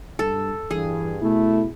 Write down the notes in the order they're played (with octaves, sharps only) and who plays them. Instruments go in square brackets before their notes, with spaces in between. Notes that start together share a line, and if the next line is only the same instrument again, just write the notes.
[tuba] G2 [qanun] A4
[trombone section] G2 [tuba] E3 [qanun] G#4
[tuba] B2 [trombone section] A3 [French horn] E4